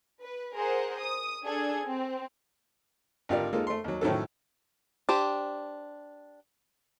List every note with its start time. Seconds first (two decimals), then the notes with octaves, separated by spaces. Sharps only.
0.22 B4
0.55 G#4 A#4 C5 F#5
0.99 D#6
1.45 D4 G#4 A4 G#6
1.85 C4
3.29 G#1 D3 F4 G4 A#4 D5
3.53 G#3 A#3 D#4 F4 A4
3.67 A3 C6
3.84 D#2 F#3
4.01 A2 D#3 F3 F#3 C#4 A4
5.09 D4 G4 C5